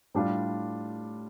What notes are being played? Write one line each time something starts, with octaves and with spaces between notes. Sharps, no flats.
A2 G3 D4 F4